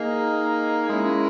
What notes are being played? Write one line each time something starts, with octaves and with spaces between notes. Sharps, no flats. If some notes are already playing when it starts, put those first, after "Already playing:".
Already playing: A#3 D#4 G#4 D#5
G#3 C#4 E4 A#4